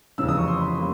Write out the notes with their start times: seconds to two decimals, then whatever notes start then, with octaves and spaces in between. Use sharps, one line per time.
0.18 F1 F2 C#3 E3 E6
0.28 D#6
0.37 C#6
0.47 C6
0.58 B5
0.68 C6
0.78 G3 A#3